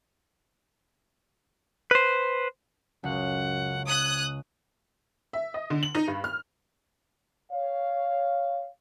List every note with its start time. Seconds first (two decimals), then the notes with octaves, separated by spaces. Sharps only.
1.91 B4 C5
3.04 C#2 F#2 F#5
3.87 D#6 F#6 G#6
5.33 E5
5.54 D#5
5.70 D3
5.83 F#7
5.95 D#4
6.08 G2
6.24 F6
7.52 C#5 F5